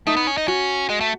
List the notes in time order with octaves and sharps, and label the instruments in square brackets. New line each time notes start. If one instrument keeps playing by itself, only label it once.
[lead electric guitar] A3 [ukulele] D#4
[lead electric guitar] B3
C#4
D#4
[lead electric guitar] C#4 [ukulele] F#4
[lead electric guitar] G#3
A3